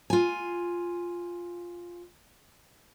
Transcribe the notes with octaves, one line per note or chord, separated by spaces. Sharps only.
F4 G#5